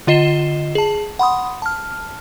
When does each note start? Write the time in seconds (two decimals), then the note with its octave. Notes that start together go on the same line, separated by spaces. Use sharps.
0.07 D3 F4 D#5 C7 E7 G7
0.75 G#4 A5
1.19 F#5 B5 C6 D#6
1.62 A5 F6